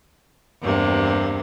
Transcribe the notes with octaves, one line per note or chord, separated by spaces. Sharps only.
E2 G2 C3 A#3